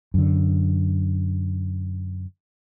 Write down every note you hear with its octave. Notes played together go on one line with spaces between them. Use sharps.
F#2 D3